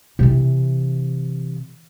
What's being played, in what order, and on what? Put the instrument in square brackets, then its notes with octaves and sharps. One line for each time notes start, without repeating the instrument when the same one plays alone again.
[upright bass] C3 E3